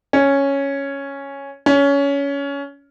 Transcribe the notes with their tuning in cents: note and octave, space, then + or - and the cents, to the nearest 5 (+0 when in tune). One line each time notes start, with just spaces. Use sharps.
C#4 +0
C#4 +20